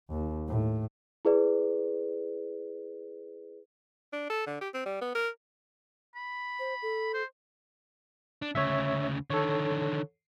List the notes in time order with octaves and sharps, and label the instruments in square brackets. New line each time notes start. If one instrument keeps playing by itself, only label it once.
[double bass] D#2
A2
[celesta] E4 G#4 B4 D5
[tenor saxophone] D4
A4
D3
G4
C4
G3
B3
A#4
[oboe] B5
[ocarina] C5
A4
[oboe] C5
[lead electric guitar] D4
[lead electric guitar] D2 C#3 [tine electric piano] C#5 E5
[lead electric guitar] D3 D#3 [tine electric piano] A4 C#5